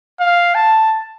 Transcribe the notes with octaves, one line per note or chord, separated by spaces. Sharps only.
F5
A5